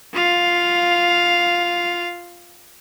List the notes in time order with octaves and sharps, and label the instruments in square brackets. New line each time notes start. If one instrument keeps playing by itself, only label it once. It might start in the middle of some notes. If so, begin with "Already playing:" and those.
[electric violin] F4 F5